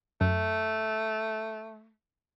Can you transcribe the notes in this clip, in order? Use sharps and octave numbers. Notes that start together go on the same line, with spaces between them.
F#2 A3